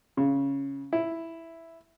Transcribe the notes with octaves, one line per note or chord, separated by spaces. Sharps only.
C#3
E4